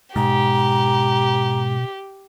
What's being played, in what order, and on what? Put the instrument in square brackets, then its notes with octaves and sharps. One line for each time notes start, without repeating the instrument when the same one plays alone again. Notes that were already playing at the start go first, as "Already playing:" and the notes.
[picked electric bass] G#2 [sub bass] B2 [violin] G4 [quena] A#5